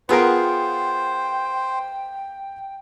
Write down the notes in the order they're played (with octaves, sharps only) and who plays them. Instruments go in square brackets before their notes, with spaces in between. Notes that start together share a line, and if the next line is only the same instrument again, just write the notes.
[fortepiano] B3 G#4 A#4 [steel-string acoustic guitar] F4 F#5 [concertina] C5 [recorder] G5